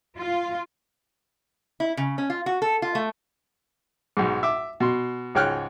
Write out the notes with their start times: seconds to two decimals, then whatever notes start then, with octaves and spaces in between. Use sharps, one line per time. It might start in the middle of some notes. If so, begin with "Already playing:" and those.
0.18 F4
1.80 E4
1.97 C#3
2.18 C#4
2.30 F4
2.46 F#4
2.62 A4
2.82 F4
2.95 A3
4.17 B1 G#2
4.43 E5 D6
4.80 B2 C6
5.35 C#2 G#2 C#5 G5 F6 F#6